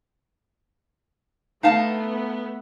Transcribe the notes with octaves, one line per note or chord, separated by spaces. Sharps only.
A3 B3 D#4 F5 A5